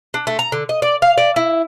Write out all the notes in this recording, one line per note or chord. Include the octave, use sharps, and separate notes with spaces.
D4
A3
A#5
D3
D#5
D5
F5
D5
E4